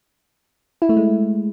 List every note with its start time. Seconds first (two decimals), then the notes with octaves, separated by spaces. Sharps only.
0.82 E4
0.89 A3
0.97 G#3